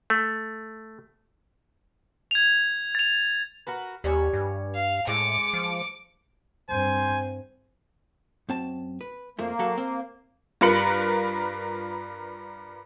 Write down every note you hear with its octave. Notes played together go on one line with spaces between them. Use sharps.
A3
G#6 F7
A6 F7
F#4 A#4 B4
D#2 G3 C#5 G#5
G2
F5
A2 G#3 D6 C#7
F3
G2 C4 C5 G#5
F#2 C4 A5
B4
F2 F3 A3 A#3
F#3 F#4 A4
C4
G2 F4 A#4 B4 C#7 F#7